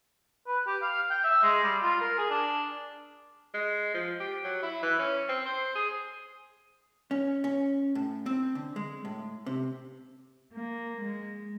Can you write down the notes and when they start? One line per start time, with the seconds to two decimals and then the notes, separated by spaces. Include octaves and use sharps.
0.47 B4
0.67 G4
0.82 F5
1.10 G5
1.24 E5
1.43 G#3
1.63 G3
1.83 F4
2.00 A#4
2.18 G#4
2.30 D4
3.54 G#3
3.94 F3
4.20 G4
4.44 F#3
4.62 E4
4.83 E3
4.99 C#4
5.29 C4
5.46 C5
5.75 G#4
7.11 C#4
7.44 C#4
7.95 A2
8.26 C4
8.55 D3
8.76 G#3
9.05 A2
9.46 C3
10.53 A#3
11.00 G#3